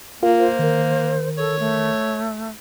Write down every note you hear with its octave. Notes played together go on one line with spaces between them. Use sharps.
A#3 F4 A#4 F5
C5
D#3 A#4
A4 C#5
A3